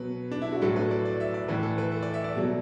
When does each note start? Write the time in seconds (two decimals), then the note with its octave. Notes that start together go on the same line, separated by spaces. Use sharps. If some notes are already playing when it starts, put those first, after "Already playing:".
Already playing: B2 F#3 B4
0.31 D4
0.42 E4
0.52 F#4
0.62 A2 F#3 A4
0.76 B4
0.91 D5
1.05 D5
1.20 E5
1.34 D5
1.48 A2 E3 B4
1.63 A4
1.78 B4
1.92 A4
2.02 D5
2.14 E5
2.24 D5
2.35 B2 F#3